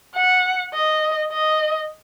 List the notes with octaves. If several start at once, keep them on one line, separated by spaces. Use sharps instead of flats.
F#5
D#5
D#5